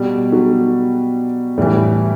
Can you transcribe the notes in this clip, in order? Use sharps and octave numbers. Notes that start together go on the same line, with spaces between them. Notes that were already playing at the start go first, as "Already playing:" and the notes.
Already playing: B2 G3
F#3
A2 E3 G3